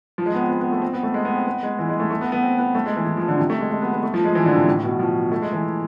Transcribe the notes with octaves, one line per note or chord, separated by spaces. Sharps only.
F3
G#3
B3
C4
B3
B3
A3
C4
B3
A3
G#3
B3
C4
B3
G#3
E3
G#3
A3
A3
B3
B3
C4
B3
A3
G#3
E3
E3
F3
D3
C3
A3
G#3
G#3
B3
B3
A3
F3
G#3
E3
D3
C3
A2
B2
F3
A3
G#3
E3